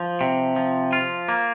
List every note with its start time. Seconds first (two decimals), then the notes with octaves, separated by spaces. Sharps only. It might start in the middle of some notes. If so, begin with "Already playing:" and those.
Already playing: F3
0.21 C3
0.56 F3
0.93 F4
1.29 A#3